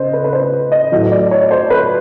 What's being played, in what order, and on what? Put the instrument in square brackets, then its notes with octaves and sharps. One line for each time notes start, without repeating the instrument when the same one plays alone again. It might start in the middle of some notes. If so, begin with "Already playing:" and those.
Already playing: [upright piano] C#3 C5 D#5
B4
B4
C5
D#5
A2 F#3 D#5
D5
C#5
C5
B4